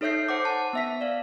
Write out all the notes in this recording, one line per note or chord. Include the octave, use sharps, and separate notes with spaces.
D#4 A4 C#5 E5 G6 C7
C5 F#5 D6
A5
B3 E5 B6
D5 F5